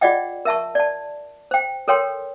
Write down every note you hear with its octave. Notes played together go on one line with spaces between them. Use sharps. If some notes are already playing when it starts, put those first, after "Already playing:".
F4 G#4 D5 D#5 F#5 G5
A#4 E5 A5 C#6
D5 A5
C5 G5
A4 A#4 C#5 G5 C6